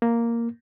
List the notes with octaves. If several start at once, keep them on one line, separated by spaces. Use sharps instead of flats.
A#3